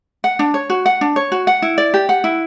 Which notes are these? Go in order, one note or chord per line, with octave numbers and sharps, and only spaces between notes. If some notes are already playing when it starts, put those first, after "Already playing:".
F#5
D4
C#5
F#4
F#5
D4
C#5
F#4
F#5
E4
D5
G4
F#5
E4